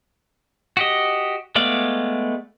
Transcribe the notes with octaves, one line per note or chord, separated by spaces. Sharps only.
F#4 G4 D#5
G#3 A3 B3 D5 F5